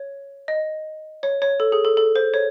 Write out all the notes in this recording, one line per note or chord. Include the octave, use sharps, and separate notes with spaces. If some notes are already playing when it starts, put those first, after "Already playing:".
Already playing: C#5
D#5
C#5
C#5
A4
G#4
A4
A4
C5
C#5